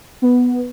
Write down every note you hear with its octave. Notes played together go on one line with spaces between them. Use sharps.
B3